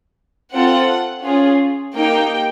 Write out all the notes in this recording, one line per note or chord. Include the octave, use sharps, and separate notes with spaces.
C4 F4 A4 F#5
C#4 F4 G#4
A#3 D#4 G4 G5